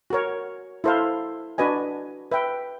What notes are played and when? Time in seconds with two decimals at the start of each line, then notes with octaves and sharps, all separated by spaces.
0.10 F#4 A#4 C#5
0.84 E4 A4 C5 F5
1.58 D4 F#4 B4 D#5 G#5
2.32 B4 E5 G5